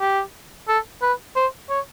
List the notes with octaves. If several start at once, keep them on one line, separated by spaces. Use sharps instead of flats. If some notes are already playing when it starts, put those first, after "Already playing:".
G4
A4
B4
C5
C#5